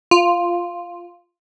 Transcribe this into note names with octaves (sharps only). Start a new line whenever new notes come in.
F4